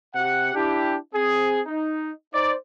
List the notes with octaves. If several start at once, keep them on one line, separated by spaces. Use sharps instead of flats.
C3 G4 F#5
D4 E4 G4
C4 G#4
D#4
D#4 C5 D5